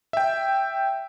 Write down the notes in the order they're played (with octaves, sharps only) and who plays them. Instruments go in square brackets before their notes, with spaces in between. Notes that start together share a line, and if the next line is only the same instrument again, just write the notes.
[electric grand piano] E5 G5